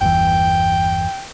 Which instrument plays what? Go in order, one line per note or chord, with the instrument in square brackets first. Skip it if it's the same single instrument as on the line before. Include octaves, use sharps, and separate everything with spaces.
[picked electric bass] G1 E2 E3 [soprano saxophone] G5